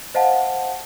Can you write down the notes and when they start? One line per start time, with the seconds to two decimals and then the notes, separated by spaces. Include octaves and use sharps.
0.15 C5 D#5 F5 F#5 A5